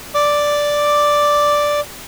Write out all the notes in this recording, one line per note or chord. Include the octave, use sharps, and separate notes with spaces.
D5 D6